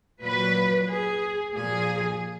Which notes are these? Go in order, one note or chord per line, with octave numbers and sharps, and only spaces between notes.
A#2 F#3 B4
G#4
A#2 F3 G#4